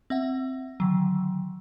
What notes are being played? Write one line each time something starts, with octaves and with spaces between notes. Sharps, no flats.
C4 E5 F#5
D3 D#3 F#3